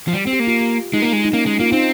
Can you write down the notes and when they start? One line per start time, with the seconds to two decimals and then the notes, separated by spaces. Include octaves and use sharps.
0.08 F3
0.13 G3 G4
0.27 C4
0.33 G4
0.40 A#3
0.47 F4
0.61 G4
0.93 G#3 D#4
1.02 A#3
1.13 G#3
1.25 D#4
1.33 A#3 C#4
1.46 G#3
1.60 A#3 F4
1.72 C4 D#4